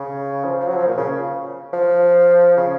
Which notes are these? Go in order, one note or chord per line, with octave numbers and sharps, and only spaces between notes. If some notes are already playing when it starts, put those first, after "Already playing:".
Already playing: C#3
F3
F3
F#3
F3
A#2
C#3
F3
C#3